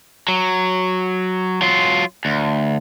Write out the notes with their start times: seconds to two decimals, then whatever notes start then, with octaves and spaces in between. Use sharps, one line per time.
0.28 F#3
1.62 F#3 F4
2.25 D2